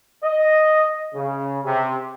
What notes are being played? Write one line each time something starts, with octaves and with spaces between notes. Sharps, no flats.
D#5
C#3
C3